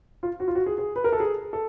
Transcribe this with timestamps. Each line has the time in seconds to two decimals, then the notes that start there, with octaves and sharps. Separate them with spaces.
0.23 F4
0.40 F#4
0.48 F4
0.55 F#4
0.66 G#4
0.78 G#4
0.96 B4
1.04 A#4
1.12 A4
1.20 G#4
1.53 A4